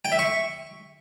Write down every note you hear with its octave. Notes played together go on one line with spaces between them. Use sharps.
G5
E5
C#6